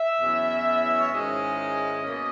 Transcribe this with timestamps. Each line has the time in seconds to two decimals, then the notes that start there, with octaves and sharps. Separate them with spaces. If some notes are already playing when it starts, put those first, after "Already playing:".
Already playing: E5
0.20 E2 B2 F#3 C#4 E4
1.01 C#5
1.12 G#2 D#3 G#3 C#4 E4 D#5
2.03 B2 A#3 C#4